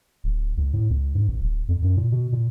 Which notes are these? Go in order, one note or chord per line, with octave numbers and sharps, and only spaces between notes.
D1
C#2
A2
C#2
G#2
A1
D1
F2
F#2
A#2
B2
A#2